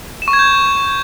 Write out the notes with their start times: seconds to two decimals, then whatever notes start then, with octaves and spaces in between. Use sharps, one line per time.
0.22 E7
0.28 C#6
0.33 G#6
0.39 G6